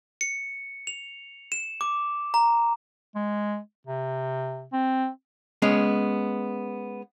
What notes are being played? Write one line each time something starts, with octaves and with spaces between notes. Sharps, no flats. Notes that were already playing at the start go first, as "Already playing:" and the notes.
C#7
F7
E7
D6
A#5
G#3
C3
C4
G#3 B3 C#4